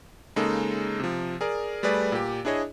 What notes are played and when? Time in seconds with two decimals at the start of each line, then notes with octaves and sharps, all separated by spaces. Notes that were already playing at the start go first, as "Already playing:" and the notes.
0.36 C#3 G#3 A#3 D#4 A4
1.00 C3 F3
1.41 G#4 A#4 D5
1.83 G3 A3 G#4 B4 D5
2.12 A#2 G4
2.45 D4 E4 G#4 C#5 D#5